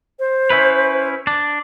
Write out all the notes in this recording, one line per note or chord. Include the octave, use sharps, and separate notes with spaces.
C5
C#4 E4 B4
D4